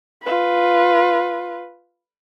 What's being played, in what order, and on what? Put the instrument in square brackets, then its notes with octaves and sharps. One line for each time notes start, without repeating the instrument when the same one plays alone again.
[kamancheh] F4 B4